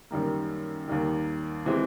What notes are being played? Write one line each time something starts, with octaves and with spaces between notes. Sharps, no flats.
F#2 D#3 G3 A#3
D#2 D#3 G3
C3 E3 G#3 C4